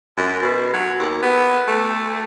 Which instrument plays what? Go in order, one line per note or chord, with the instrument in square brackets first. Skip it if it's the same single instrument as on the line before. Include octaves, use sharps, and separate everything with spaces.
[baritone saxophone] F#2
B2
F#3
D#2
B3
A3